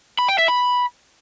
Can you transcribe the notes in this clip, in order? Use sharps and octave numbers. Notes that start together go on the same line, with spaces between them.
B5
G5
E5
B5